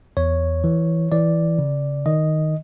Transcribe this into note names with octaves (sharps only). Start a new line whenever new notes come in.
E2 C#5
E3
E3 D5
C#3
D#3 D#5